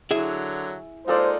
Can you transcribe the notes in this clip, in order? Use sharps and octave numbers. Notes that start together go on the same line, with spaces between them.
D3 F#3 E4 G#4 C#5 E5
G#3 A#3 D#4 F4 A4 C5 D5